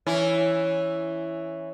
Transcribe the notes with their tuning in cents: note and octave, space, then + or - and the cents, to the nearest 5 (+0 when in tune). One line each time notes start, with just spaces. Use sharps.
E3 +0 C#4 +0 E4 +0